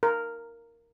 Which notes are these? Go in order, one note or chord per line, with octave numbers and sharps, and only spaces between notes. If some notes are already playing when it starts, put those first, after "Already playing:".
A#4